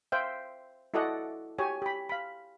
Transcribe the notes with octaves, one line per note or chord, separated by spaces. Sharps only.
C5 E5 F5 G5
E4 F#4 A4 D5 D#5 F#5
F#4 G4 C#5 G#5
G4 B5
F5 B5